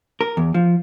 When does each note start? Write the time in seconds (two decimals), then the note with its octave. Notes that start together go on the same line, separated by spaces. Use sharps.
0.21 A#4
0.37 E2
0.54 F3